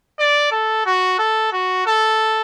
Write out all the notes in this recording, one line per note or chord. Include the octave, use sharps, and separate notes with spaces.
D5
A4
F#4
A4
F#4
A4